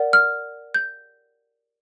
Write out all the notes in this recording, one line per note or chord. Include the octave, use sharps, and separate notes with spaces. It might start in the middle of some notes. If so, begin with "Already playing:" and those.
Already playing: A#4 D5 F#5
F6
G6